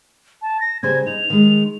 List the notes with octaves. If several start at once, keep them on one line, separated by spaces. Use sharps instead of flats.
A5
A#6
C#3 G3 C5 G#6
D#4 F7
D#3 G#3